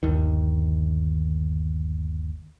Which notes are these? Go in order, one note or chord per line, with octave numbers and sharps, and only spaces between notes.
G1 D#2 D#3